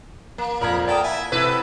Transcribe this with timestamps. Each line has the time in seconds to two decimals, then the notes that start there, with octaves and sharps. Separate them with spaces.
0.38 A#3
0.61 A#1 F2 A#4 B5 G#6
0.88 A4 A#4 D5 F#5 G5 D#6
1.03 E4 E5 G#5
1.32 C3 E4 F#4 A4 B4